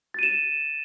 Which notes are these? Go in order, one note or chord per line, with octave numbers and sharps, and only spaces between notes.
A6 D#7 E7